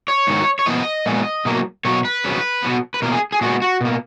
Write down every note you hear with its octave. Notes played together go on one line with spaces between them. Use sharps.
C#5
G#2 D#3 F#3
C#5
A#2 F3 B3 D#5
A#2 F3 G#3 B3
B2 F#3 A#3
B2 F#3 A#3 C#5
B4
F2 C#3 F#3 B3
B2 F#3 B3
B4
B2 A#3 A#4
G#4
G#4
A#2 G#3 B3 F#4
F#4
B2 A#3